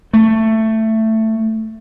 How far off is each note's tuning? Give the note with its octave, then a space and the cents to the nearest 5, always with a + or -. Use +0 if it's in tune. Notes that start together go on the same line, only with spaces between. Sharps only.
A3 +10